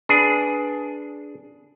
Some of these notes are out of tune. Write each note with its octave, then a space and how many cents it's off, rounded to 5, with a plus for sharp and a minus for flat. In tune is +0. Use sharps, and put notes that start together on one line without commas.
D4 -5 G#4 +10 B4 +0